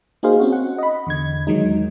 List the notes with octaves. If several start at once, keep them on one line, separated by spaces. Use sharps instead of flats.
A#3 D#4 F#4 G#4 C5 F5
C4 C#4 F#4
F#5
D#5 B5
E2 D3 G#6
E2 D#3 F#3 G#3 D#4